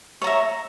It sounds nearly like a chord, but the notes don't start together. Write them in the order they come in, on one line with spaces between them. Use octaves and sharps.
C#5 A#5 E5